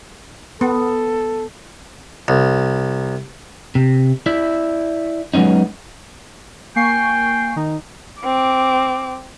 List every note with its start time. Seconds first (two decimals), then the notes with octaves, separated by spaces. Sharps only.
0.61 B3 A4
2.28 C2
3.75 C3
4.26 E4 D5 E5
5.34 F#3 G#3 B3 C#4 D#4
6.76 A#3 G5 G#5 C#6 C7
7.56 D#3 D#4
8.22 C4 D6